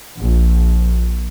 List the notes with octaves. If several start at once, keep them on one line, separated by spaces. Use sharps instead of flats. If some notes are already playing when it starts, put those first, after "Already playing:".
A#1